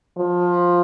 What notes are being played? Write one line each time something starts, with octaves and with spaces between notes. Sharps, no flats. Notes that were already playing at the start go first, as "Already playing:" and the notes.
F3